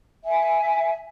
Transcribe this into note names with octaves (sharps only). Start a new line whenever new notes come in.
E5 G#5